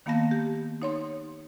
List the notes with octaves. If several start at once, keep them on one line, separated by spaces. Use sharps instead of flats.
D#3 A#3 B3 F5 A5 A#6
G4
D#4 C#5 C6